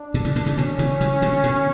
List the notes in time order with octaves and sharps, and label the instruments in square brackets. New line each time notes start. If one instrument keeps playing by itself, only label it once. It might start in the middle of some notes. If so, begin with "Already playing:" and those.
Already playing: [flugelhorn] D4
[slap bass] B2 D3
C#3 E3
B2 D3
C#3 E3
[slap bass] B2 D3 [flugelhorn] C#4
[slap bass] C#3 E3
C#3 E3
B2 D3
B2 D3